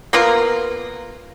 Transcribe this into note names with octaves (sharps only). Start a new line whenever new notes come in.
A#3 B3 F4 A#4